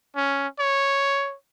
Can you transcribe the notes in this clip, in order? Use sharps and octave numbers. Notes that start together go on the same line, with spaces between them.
C#4
C#5